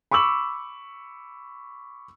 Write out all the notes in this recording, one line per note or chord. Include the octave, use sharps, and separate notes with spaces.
B5 C#6 D6 E6 F#7